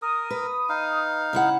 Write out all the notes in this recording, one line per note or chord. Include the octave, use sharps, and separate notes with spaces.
A#4 D#6
B4
D#4 F5
C#3 E4 F#5